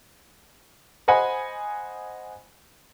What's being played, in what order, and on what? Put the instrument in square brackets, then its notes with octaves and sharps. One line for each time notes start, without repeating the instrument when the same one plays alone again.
[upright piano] C5 D#5 F#5 G#5 B5